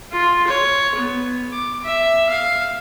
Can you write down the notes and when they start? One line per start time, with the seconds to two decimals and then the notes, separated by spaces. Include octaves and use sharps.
0.12 F4
0.47 C#5
0.95 B3
1.52 D6
1.84 E5
2.29 F5